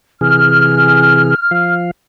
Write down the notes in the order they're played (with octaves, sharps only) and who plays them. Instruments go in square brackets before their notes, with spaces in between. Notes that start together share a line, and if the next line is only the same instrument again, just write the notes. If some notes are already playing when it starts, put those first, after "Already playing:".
[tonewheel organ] C3 E3 G#4 [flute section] F6
[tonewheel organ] F3 F5